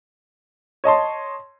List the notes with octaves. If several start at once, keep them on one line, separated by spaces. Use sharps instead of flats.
C#5 D#5 A5 C6